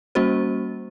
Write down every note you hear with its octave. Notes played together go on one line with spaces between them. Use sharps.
G3 A#3 C#4 F#4 C5